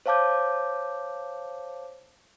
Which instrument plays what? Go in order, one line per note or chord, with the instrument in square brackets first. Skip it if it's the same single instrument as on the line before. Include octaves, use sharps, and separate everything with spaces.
[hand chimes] C5 C#5 F5 A5 D6 G6